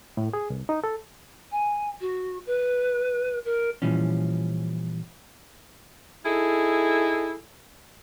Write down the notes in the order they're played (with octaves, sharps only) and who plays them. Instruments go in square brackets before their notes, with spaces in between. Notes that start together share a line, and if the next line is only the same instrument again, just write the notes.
[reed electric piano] A2
G#4
C2
D#4
A4
[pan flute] G#5
F#4
B4
A#4
[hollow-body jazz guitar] A#2 E3 F3 G3 C#4
[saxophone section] D#4 E4 G#4 A4